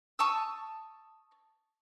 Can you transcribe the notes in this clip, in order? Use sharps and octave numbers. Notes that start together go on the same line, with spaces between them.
A5 C#6 D#6 E6